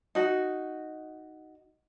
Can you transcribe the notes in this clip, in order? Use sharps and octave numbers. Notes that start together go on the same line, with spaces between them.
D#4 F#4